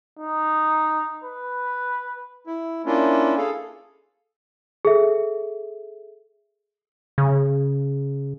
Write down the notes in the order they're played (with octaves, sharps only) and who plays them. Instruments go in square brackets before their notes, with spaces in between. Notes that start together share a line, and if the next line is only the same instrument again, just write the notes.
[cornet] D#4
B4
[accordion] E4
A#3 C#4 D4 E4 F4
G#4 A4 F5
[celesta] G#4 A4 E5
[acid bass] C#3